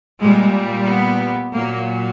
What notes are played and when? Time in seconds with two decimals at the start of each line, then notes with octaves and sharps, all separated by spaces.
0.20 A#2 G3 G#3
0.86 B3
1.53 A#2 F#3 A#3